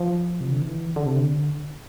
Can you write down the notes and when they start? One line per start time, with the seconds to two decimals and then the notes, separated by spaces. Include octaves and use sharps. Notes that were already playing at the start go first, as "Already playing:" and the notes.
Already playing: F3
0.41 C3
0.52 D3
0.62 E3
0.96 D3
1.06 C3
1.17 D3